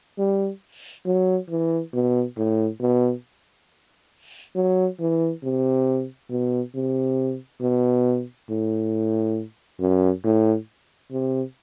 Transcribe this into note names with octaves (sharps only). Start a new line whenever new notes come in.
G3
F#3
E3
B2
A2
B2
F#3
E3
C3
B2
C3
B2
A2
F#2
A2
C3